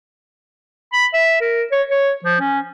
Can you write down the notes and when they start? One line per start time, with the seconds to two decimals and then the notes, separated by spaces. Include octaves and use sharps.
0.93 B5
1.14 E5
1.41 A#4
1.72 C#5
1.89 C#5
2.25 F3
2.40 C#4